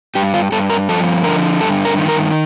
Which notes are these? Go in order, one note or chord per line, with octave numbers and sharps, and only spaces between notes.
G2 G4
F4
G2 A4
A#4
F3 A4
D3 A#4
G2 A4
A#4
D#3
A#4